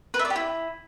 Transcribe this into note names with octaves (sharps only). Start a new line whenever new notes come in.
B4
E5
D5
G4
E4